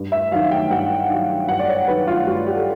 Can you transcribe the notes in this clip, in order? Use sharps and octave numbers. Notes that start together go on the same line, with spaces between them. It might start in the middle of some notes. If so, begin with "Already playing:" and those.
Already playing: G2
E5
D#3 F#3 F5
G5
G2 F#5
D#3 F#3
G2 F#5
D5
C#5
D#3 F#3 B4
F4
G2 F#4
G4
A4